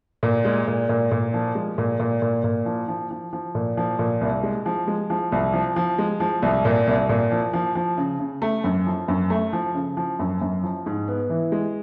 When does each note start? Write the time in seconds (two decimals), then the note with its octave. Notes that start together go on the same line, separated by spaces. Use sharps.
0.23 A#2
0.45 G#3
0.68 A#2
0.89 A#2
1.11 A#2
1.34 F3
1.55 G#3
1.78 A#2
2.00 A#2
2.22 A#2
2.44 A#2
2.66 F3
2.88 F3
3.11 F3
3.33 F3
3.55 A#2
3.77 F3
3.99 A#2
4.21 C2
4.43 G#3
4.66 F3
4.88 G#3
5.10 F3
5.32 C2
5.54 F3
5.76 F3
5.98 G#3
6.20 F3
6.42 C2
6.65 A#2
6.87 C2
7.09 A#2
7.31 F3
7.53 F3
7.75 F3
7.98 C#3
8.20 C#3
8.42 A3
8.64 F#2
8.87 F3
9.08 F#2
9.30 A3
9.53 F3
9.75 C#3
9.97 F3
10.19 F#2
10.41 F#2
10.63 F3
10.86 G#2
11.08 B3
11.30 E3
11.52 G#3